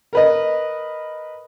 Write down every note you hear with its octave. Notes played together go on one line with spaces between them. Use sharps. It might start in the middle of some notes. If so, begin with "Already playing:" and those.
A#4 B4 D#5